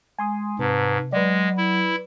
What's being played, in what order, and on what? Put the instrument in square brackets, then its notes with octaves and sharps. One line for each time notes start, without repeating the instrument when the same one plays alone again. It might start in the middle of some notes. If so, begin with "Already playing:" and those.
[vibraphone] G#3 [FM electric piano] G#5 C6 D#6
[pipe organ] G#2 [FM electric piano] C3 [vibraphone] B4 A5
[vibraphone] F#3 [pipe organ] G#3 [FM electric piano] B4 D5
[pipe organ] E4